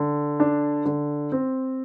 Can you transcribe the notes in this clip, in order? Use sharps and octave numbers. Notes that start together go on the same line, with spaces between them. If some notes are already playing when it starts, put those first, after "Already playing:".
Already playing: D3
D4
D3
C4